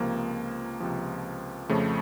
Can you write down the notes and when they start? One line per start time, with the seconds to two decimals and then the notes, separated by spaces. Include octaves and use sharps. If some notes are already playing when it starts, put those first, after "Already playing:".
Already playing: C#2 C3 F3 A#3
0.80 C#2 C3 F3
1.69 F2 C#3 F3 A3